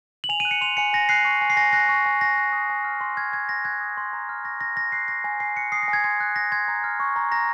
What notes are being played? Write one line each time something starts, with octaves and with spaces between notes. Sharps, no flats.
F#7
G#5 F7
D#7
F#6
C#7
C6 F7
G#5 C#7
G#5 A#6
F#6 C7
C#6
G#5
C7
G#5 A#6
F#6 A#6
C#6
G#5
G#5 A#6
F#6
D#6
G#5
F6
C6
F6 G#6
C6 G#6
C6 A#6
F#6 G#6
D#6
C6
A#5
F6
C#6 A#6
A#5 A#6
G#5 A#6
F#6 C7
C#6 A#6
G#5 A#6
G#5 C7
F#6 C#7
D#6 C7
A#6
G#5
G#6
C6 G#6
F#6
D#6 A#6
C6 G#6
A#5
F6
C#6
A#5
A#5 A#6